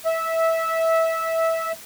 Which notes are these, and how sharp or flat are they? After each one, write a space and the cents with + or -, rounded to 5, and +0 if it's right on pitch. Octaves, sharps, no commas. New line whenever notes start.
E5 -15